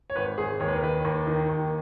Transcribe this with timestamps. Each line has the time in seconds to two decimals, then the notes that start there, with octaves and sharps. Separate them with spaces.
0.10 C#5
0.16 G#1 B4
0.38 G#1 G#4
0.60 D#2 C#5
0.68 B4
0.76 A#4
0.82 D#3 B4
1.05 D#2
1.27 D#3
1.49 D#2